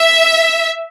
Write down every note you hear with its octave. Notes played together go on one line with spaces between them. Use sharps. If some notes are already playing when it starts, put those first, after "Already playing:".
Already playing: E5